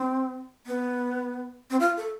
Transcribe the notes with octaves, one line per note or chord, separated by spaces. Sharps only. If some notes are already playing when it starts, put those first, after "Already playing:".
Already playing: C4
B3
C4
F4
A4